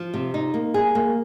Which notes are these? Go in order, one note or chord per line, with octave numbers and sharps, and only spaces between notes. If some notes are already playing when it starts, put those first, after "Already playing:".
Already playing: F3
C3
D#4
A#3
G#4
A#3